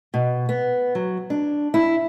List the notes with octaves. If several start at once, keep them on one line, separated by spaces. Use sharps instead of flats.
B2
B3
F#3
D4
E4